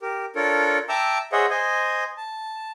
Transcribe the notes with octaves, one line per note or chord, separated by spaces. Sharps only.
G4 A#4
D4 F4 A4 A#4 C#5
E5 G5 A5 A#5 D6 E6
G#4 C5 C#5 D#5 E5 F#5
C5 D#5 G#5
A5